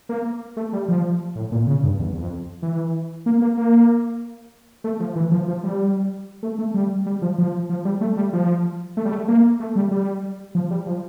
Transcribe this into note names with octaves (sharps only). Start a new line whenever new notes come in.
A#3
A3
G3
F3
A2
A#2
C#3
G2
E2
F2
E3
A#3
A#3
A#3
A3
F3
E3
F3
F3
G3
A3
A3
G3
G3
F3
F3
F3
G3
A3
G3
F3
A3
G3
A3
A#3
A3
G3
G3
F3
G3
F3